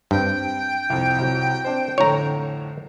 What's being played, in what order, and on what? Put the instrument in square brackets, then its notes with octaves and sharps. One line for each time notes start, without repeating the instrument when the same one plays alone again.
[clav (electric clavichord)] G2 [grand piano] C4 [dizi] G5
[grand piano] C2 F2
C2 F2 F#3
C4 D4 C5
[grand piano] F2 A2 D3 [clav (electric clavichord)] C#5 A#5